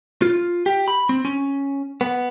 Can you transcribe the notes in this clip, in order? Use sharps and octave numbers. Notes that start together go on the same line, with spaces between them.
F4
G4
B5
C4
C#4
B3